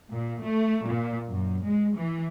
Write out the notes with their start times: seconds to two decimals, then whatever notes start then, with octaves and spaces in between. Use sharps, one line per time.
0.10 A#2
0.40 A3
0.84 A#2
1.28 F#2
1.63 G#3
1.97 E3